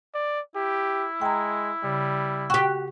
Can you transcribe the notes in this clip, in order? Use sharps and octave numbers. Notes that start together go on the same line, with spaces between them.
D5
E4 G4
G#3 G5 A#5
C#3 G3
F#4 G4 G5 C#6